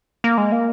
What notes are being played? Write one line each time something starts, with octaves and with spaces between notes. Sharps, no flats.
A#3
G#3
A#3